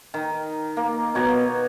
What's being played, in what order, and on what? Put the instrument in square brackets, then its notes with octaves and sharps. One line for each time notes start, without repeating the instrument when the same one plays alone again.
[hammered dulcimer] D#3
A#3
[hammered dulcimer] B2 C#5 A#5 [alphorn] B3